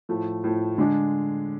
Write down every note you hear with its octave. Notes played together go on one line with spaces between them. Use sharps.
A2 F3 A3
A2 F3 A3
D3 G#3 D4